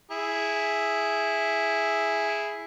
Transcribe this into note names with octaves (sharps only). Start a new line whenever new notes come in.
E4 G#4